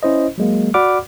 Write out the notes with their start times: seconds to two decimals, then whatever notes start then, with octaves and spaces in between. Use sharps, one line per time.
0.03 C#4 E4 C5 D#5
0.38 F#3 G#3 A#3
0.74 F#4 D5 F#5 B5 D6 F6